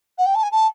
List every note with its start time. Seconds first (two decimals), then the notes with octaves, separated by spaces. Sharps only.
0.18 F#5
0.26 G5
0.35 A5
0.43 G#5
0.52 A5